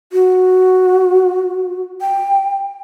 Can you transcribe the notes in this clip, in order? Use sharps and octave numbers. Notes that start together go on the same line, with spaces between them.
F#4
G5